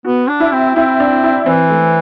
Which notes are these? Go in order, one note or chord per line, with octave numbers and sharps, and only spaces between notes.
B3 F#4
D4
E4
C4
C4 E4
D4
E4
E3 C4
A3